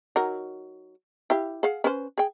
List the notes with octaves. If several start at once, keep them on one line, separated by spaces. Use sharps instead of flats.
F#3 D#4 A#4
E4 G4 F5
G#4 F5 F#5
C#4 B4 C5
G#4 G5